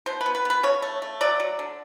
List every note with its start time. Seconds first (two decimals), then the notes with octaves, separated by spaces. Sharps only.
0.06 B2 C5
0.21 B4
0.26 B3
0.35 B4
0.45 B3 B4
0.63 C#3 C#5
0.82 A3
1.02 A3
1.21 F#3 D5
1.40 F#3
1.59 D3